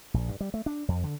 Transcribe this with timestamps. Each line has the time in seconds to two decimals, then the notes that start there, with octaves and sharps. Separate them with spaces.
0.14 A#1
0.29 G2
0.41 G3
0.54 A3
0.66 D4
0.88 F2
1.04 D3